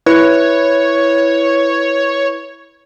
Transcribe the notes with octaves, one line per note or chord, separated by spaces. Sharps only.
E4 B4 C#5